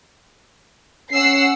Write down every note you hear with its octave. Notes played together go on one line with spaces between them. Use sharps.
C#4 F#5 E6 C7